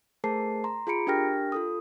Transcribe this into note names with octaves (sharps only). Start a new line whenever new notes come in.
A3 G#4 A#4 C5 A5 C7
A#5 C6
F4 G#4 A#5 B5 C#7 D7
D4 G4 A#4 G5 F6 A#6
F4 A4 D#6